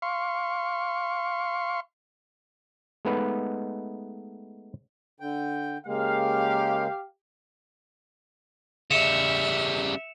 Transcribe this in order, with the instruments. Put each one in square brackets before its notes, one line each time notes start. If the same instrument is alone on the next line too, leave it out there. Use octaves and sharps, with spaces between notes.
[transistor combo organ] F5 C6 C#6
[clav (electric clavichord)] G#3 A3 B3 D#4 B4
[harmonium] D3 G5
[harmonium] C#3 G#3 A#3 [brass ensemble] G4 F5
[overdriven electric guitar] C#3 G3 [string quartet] E5 [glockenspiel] C#7 E7 F7